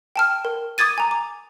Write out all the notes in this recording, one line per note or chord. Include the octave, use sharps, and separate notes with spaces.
G5 A5 F6
A#4
D6 D#6 G#6 A6 D#7
G#5 A#5
D6